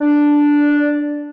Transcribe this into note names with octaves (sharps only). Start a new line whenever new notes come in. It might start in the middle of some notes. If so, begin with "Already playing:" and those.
D4